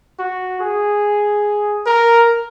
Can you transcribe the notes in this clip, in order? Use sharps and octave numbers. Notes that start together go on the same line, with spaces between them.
F#4
G#4
A#4